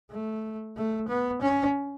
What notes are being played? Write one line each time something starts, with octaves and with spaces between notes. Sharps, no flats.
A3
A3
B3
C#4